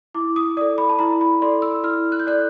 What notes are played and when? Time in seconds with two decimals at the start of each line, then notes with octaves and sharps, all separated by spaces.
0.14 E4 D6
0.36 D#6
0.57 A4 D5 D#6
0.78 B5
0.89 A5
0.99 E4 A#5
1.21 B5
1.42 A4 D5 C6
1.62 E6
1.84 E4 F6
2.12 F#6
2.20 G6
2.27 A4 D5 F#6